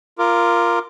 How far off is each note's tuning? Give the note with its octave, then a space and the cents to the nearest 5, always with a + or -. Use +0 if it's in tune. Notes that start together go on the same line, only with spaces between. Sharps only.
F4 -10 A#4 +0 D6 +10